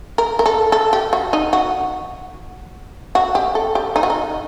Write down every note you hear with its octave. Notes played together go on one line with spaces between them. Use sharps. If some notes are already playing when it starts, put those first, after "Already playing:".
A#4
A#4
A4
A4
G4
F#4
D#4
F#4
F#4
G4
A4
G4
D#4
F#4
D#4